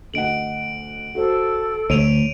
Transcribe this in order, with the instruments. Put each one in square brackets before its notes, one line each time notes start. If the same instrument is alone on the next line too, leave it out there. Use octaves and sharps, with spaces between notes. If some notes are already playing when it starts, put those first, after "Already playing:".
[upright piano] D2 D#5 F#5 [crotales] D7 F#7
[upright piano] F#4 C5 [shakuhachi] A4
[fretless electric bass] D2 [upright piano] C#5 [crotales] D7 D#7 F7